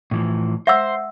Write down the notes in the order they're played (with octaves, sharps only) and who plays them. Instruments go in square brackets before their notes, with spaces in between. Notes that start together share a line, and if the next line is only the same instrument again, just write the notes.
[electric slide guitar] A2 E3 F3
[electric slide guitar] C5 [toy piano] E5 F#5 E6